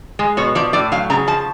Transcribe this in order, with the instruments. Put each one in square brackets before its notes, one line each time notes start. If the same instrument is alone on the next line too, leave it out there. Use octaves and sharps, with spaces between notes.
[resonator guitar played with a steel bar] G#3
B2 C#5
F3 D5
A2 D5
F#3 F5
C#3 A#5
F3 A5